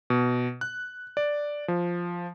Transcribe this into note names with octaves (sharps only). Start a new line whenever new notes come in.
B2
F#6
D5
F3